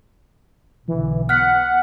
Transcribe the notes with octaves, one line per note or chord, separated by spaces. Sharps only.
B1 D3 E3
B3 F#5 F6 F#6 B6